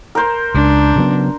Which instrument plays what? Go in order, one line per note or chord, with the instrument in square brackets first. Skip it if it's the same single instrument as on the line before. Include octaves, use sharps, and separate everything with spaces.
[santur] A#4 C5
[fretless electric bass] C#2 [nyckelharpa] D4
[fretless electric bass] C#3 F#3 B3